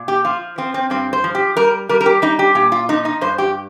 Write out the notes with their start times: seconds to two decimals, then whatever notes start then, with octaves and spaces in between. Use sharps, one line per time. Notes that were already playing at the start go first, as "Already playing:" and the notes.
Already playing: A#2
0.08 G4
0.25 F3 F4
0.58 F3 C4
0.74 C4
0.90 G2 C4
1.13 C5
1.24 F3
1.35 G4
1.57 G3 A#4
1.89 G3 A#4
2.01 A#4
2.06 G4
2.22 G3 D#4
2.39 G4
2.55 A#2 G4
2.72 F4
2.89 F3 D#4
3.05 D#4
3.21 G2 C5
3.38 G4